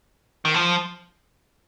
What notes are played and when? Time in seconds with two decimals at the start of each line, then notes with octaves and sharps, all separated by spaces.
0.45 D#3
0.54 F3